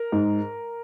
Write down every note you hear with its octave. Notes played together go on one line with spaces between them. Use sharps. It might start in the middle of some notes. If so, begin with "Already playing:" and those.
Already playing: A#4
G#2